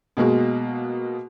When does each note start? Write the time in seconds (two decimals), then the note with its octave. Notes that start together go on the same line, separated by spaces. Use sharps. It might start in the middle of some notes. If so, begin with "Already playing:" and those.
0.17 B2 G#3 A#3 F#4